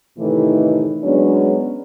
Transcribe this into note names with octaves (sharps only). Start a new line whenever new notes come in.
A2 C3 D#3 E3 A3 D#4
F#3 G#3 B3 C#4 D4